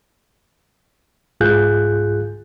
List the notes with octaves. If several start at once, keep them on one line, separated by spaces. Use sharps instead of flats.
C2 G#2 F4 G#4 F#6 G6